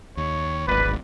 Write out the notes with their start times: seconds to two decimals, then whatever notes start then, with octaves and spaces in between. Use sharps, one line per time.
0.17 D#2 C#5
0.68 D1 G#1 B4 D5